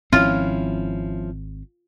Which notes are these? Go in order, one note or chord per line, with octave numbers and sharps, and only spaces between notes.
G#1 F3 C4 C#4 E4 F4